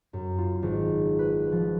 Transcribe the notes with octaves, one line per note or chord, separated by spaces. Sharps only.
F#2
F4
G#1
B4
F3